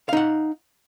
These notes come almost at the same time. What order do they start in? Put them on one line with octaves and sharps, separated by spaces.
F5 D#4 F#5